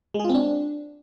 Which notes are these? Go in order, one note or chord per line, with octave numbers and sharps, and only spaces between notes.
G#3
G#4
F4
C4
D4